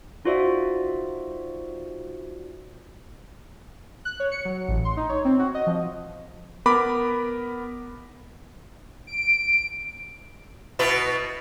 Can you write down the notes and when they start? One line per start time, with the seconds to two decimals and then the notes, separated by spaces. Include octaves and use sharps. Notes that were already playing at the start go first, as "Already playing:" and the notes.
0.25 D#4 F4 F#4 C5 D5 E5
4.05 F#6
4.20 C#5
4.32 C#7
4.45 F#3
4.68 A1
4.85 C6
4.97 D#4
5.09 C#5
5.25 C4
5.39 F#4
5.54 D#5
5.67 F3
6.66 B3 A#4 B5 D6
9.07 D7
10.79 B2 E4 B4